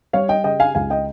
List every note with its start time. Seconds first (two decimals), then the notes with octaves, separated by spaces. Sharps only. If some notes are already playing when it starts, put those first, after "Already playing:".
0.13 G3 C#5 F5
0.29 D#5 G5
0.44 C#3 D#5 G5
0.60 F5 G#5
0.75 C#2 F5 G#5
0.90 D#5 G5